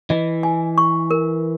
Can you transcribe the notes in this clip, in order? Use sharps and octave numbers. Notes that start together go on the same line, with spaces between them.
E3 D#5
G#5
C#6
A#4